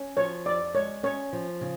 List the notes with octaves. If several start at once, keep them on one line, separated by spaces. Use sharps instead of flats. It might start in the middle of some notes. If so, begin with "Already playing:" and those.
Already playing: C#4
F3 C#5
F2 D5
G#3 C#5
C#4 C#5
F3
C#3